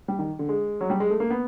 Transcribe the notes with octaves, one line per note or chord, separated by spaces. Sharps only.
G3
D#3
D3
G#3
F#3
G3
G#3
A3
A#3
B3